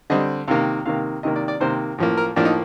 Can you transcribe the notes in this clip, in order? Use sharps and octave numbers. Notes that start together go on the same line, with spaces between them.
D3 G3 C4 D#5
C3 D#3 A#3 F5
C3 D#3 A#3 F5
C3 D#3 A#3 D#5
D5
D5
C3 D#3 A#3 C5
A2 F3 A#3
A#4
A2 F3 A#3 D4
D#4